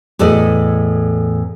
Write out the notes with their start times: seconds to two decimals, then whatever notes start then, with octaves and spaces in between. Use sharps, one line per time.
0.19 E2 A2 A4 D5 D#5